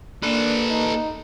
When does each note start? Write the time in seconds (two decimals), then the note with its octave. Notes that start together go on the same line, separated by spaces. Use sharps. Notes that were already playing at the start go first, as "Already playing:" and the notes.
0.23 A#3 D4 A4 B4
0.70 D#4